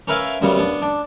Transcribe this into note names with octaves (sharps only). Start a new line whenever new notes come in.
C#4 A#4 B4 E5 F5 G#5
F#2 C#3 G3 B3
B3 D4
D4